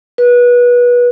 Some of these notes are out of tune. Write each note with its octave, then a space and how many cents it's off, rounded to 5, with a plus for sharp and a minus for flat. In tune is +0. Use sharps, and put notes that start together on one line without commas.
B4 -25